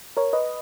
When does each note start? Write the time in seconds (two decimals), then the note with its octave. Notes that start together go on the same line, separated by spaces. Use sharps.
0.17 A#4 C#5
0.33 B4 D#5